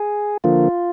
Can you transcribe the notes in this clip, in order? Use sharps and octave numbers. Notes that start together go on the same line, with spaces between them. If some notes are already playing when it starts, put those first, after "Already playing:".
Already playing: G#4
D3 F3 A#3 F4